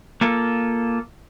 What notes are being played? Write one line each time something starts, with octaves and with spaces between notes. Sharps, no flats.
A#3 F4 A4